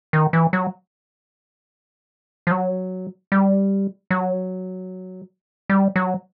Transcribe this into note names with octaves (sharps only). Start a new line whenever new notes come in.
D#3
E3
F#3
F3
F#3
G3
F#3
G3
F#3